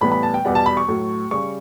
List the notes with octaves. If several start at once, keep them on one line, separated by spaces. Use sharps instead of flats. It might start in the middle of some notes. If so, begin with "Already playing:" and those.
A2 E3 G3 B3 B5
B5
A5
G5
E2 B2 G3 B3 F#5
A5
B5
C#6
A2 F#3 A3
C#3 G3 C#6